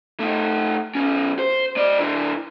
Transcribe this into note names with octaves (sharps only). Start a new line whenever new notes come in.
A3 D#4
B1 C#4
C5
G#3 D5
D3 E4